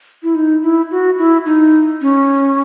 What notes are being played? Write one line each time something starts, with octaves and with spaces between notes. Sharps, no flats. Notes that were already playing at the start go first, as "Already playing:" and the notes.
E4
D#4
E4
F#4
E4
D#4
C#4